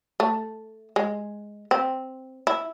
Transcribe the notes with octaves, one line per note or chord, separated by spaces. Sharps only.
A3
G#3
C4
E4